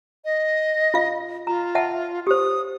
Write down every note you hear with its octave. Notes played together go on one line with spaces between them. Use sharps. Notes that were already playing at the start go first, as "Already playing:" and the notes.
D#5
F4 F5
F4 A#5
E5 F#5 A5
G4 C5 D#6